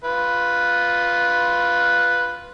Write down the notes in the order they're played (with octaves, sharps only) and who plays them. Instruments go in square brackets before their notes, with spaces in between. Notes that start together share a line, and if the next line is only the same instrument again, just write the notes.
[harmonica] F4 B4